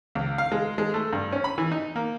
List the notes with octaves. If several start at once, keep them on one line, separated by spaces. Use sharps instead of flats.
C#2
F5
G#3
G#3
A3
G2
C#4
B5
E3
D#4
A#3